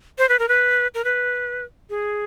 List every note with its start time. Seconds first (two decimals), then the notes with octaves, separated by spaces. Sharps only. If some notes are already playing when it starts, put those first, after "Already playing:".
0.18 C5
0.29 B4
0.39 A#4
0.49 B4
0.94 A#4
1.04 B4
1.90 G#4